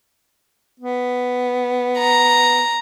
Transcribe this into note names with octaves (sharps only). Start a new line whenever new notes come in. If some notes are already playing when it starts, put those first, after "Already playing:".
B3
A#5